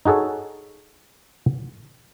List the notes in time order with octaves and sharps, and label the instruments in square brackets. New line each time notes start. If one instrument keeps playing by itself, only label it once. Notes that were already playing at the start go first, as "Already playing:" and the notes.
[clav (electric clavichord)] D#4 F#4 G#4 A4 C#5